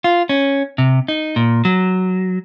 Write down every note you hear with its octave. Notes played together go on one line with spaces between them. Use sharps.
F4
C#4
C3
D#4
A#2
F#3